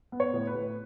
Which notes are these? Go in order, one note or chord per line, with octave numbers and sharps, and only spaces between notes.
B3
C#5
A2
B4
A2